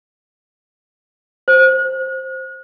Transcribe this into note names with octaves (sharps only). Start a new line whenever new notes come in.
C5